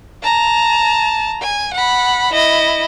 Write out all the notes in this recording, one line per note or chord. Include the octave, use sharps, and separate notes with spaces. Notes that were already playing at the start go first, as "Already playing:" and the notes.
A5 A#5
G#5
F#5 B5
E4 D#5